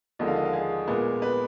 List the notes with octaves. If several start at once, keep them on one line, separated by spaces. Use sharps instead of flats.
D#2 D3 F3 G#3 D#5
F5
D#5
F5
G#4
A#2 G#3 B3
B4